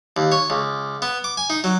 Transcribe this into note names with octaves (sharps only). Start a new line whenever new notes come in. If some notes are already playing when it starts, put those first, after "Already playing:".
D#2
C#5
C#2
B3
D6
G#5
D#4
F#3